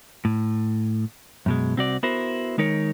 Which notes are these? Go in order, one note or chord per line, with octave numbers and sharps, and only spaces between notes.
A2
F#2 B2 G#3
C2 C4 F#4 D5
B3 E4 F#4 A#4 C5
D#3 G#3 D#4 A#4 C#5